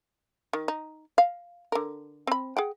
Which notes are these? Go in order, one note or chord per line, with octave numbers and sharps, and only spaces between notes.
D#3
D#4
F5
D3 A#4
C4 B5
G#4 F#5 G5